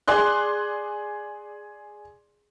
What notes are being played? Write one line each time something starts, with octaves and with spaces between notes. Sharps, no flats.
G#4 D5 C6 F#6